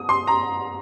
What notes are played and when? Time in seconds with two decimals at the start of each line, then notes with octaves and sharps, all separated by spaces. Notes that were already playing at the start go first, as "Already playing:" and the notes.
Already playing: D#6
0.09 C6
0.27 A#5